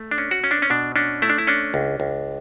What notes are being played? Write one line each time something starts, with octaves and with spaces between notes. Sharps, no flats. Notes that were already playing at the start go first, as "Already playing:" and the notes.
Already playing: A3
D4
C#4
F#4
C#4
D4
C#4
B2 D4
C#4 D4
A3 E4
D4
E4
C#4 D4
C#2
C#2